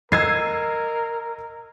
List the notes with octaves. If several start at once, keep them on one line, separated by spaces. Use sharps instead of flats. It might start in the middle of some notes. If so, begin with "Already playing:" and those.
A#4 D#5 E6 G#6 C7